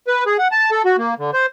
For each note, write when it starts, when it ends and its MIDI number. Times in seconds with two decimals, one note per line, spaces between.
0.07 0.24 71
0.26 0.37 68
0.39 0.48 78
0.52 0.70 81
0.71 0.82 69
0.85 0.96 66
0.98 1.14 58
1.19 1.31 50
1.34 1.46 72